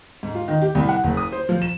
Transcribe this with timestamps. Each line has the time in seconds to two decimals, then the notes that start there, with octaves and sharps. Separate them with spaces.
0.23 G#2
0.35 F4
0.48 D#3
0.62 G4
0.75 C2
0.89 F#5
1.04 F#1
1.17 D#6
1.32 C5
1.49 F3
1.62 E7